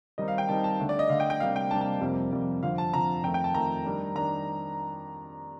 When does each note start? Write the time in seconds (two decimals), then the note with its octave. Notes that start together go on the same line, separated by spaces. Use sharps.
0.18 D#3 G3 C4 D#4 D#5
0.28 F5
0.38 G5
0.49 D#3 G3 C4 D#4 A5
0.64 A5
0.79 D3 A3 D4
0.89 D5
0.99 D#5
1.09 D3 A3 D4 F5
1.20 G5
1.30 G5
1.40 C3 G3 A#3 D4 F5
1.56 G5
1.71 C3 G3 A#3 D4 A5
1.81 A5
2.01 F2 C3 G3 A#3
2.32 F2 C3 G3 A#3
2.63 F2 D3 F3 F5
2.78 A5
2.93 F2 D3 F3 A#5
3.24 F2 D#3 A3 G5
3.34 G5
3.44 A5
3.54 F2 D#3 A3 A#5
3.85 D#3 G3 D4
4.16 D#3 G3 D4 A#5